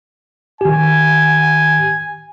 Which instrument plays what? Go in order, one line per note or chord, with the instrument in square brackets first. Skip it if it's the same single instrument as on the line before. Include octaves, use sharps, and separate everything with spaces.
[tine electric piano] D#3 G4 [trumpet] G#5